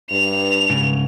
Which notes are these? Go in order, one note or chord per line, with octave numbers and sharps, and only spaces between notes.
G2 F7
G#2 C#3